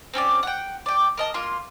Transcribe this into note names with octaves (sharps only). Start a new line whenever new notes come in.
C4 C#4 G4 D5
F#5 G5
D5 G5
A#4 D#5 A5
A#3 F4 C6